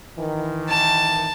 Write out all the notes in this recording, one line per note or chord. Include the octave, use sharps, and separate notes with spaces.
D#3 E3
A5